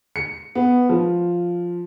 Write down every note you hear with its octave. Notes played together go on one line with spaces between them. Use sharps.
C#7
B3
F3